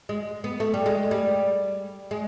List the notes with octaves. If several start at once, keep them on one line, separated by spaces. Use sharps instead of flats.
G#3
B3
A3
G3
G#3
G3
G#3